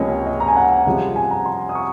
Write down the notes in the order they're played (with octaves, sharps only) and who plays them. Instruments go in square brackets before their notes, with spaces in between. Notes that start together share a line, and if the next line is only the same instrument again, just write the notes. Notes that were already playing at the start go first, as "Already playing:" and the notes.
Already playing: [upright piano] C#2 C3 F3 A#3 C#4 C#5 D#5
D#5
A#5
G#5
F#5
C2 C3 F3 G#3 C#4
G#5
A#5
C6
D#6
C#6